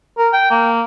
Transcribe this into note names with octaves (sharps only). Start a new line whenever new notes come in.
A#4
G5
A#3